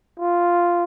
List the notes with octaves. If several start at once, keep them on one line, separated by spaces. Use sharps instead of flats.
F4